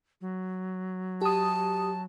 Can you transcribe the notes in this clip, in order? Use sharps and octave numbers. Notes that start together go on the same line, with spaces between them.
F#3
G4 A5 D#6